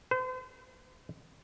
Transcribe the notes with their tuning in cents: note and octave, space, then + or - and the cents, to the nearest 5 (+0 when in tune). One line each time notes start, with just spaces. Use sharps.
C5 -40